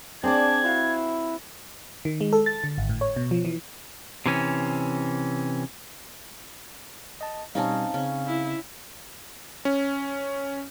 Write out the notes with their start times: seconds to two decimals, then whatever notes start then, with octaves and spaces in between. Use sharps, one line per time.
0.24 C4 D4 G#4 D5 G#6
0.65 E4 F#4 F5
2.05 D#3
2.21 G#3
2.33 A4
2.46 A6
2.64 D3
2.78 G#1
2.89 A2
3.01 C#5
3.16 B2
3.31 F3
3.45 E3
4.26 C3 E3 C#4
7.21 D#5 A5
7.55 B2 G3 C4 C#4 D#4 F5 A5
7.94 C#3 C4 C#4 F5
8.27 E4
9.65 C#4